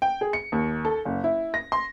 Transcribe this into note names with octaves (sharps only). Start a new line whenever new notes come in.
G5
G#4
C#7
D#2
A4
F#1
E4
A#6
C6